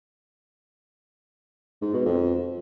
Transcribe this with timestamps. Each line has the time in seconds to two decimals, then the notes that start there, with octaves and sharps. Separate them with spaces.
1.82 G#2
1.93 B2
2.05 F2